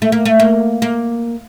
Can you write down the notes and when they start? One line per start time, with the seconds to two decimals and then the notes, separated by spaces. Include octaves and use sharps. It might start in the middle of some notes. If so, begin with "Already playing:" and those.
0.02 A3
0.12 A#3
0.25 A3
0.40 A#3
0.82 A#3